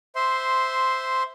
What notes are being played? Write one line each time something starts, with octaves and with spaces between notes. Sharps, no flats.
C5 E5 C6